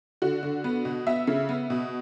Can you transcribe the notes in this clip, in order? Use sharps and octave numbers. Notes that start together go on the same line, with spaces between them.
D3 F#4
D3
B3
B2
B3 E5
C#3
B3
B2